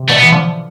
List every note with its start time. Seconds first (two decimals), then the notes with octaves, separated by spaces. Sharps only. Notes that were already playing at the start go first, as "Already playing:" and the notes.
Already playing: C3
0.08 B2 D3 A3
0.17 B3
0.23 E3
0.32 D3 F3